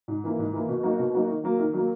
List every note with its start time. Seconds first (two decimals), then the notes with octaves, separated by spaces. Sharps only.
0.08 G#2
0.24 E3 A#3 E4
0.39 G#2
0.53 E3 A#3 E4
0.68 B2
0.83 F#3 A#3 D#4 F#4
0.99 B2
1.14 F#3 A#3 D#4 F#4
1.28 D#3
1.44 F#3 A#3
1.59 D#3
1.73 F#3 A#3